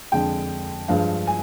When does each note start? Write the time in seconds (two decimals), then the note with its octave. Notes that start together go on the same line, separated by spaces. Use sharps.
0.12 F2 D3 G#3 G5
0.88 G2 F3 G#3 F5
1.27 G#5